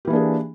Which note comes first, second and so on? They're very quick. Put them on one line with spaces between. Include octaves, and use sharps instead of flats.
G4 E3 A#3 D4 G#4